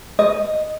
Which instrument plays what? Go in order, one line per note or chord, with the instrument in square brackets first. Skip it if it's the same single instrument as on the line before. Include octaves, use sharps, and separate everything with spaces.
[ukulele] D#5